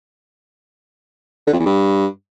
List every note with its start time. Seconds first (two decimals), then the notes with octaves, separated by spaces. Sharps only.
1.47 D3
1.53 F2
1.59 E2
1.65 G2